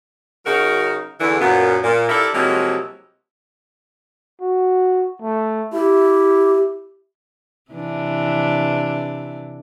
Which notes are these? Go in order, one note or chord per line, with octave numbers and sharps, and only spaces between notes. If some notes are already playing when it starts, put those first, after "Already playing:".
C#3 F#3 D#4 F#4 A#4
E2 D3 E3
F#2 A#2 B3
A#2
D4 E4 G4 A4 A#4 E5
C3 F3 F#3 G#3 A#3 E4
F#4
A3
E4 G4
C3 E3 D4